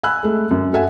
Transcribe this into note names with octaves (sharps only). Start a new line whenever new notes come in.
G#5 B5 E6 F#6
G#3 A3
F#2
F#4 A4 E5 F#5 G#5